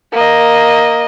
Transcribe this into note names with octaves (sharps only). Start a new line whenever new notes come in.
A#3 D#5